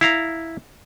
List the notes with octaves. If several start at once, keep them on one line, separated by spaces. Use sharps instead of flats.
E4 F5 A#5